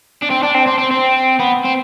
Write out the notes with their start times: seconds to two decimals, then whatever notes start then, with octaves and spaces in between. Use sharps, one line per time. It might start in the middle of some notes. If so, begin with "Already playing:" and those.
0.22 D4
0.30 C4
0.43 D4
0.54 C4
0.67 C4
0.78 C4
0.91 C4
1.40 B3
1.65 C4